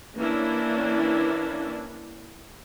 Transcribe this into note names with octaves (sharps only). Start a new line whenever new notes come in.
E3 A#3 C#4 D4 E4